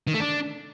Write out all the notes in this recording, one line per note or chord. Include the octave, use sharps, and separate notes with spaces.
D#3
A3
D4